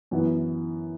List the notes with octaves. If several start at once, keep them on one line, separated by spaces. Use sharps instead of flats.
F#2 E3 B3 E4